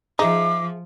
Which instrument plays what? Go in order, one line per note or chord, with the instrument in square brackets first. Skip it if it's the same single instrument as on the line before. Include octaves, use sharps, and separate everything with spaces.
[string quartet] F3 [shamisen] D#4 [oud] G#4 E5 [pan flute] D6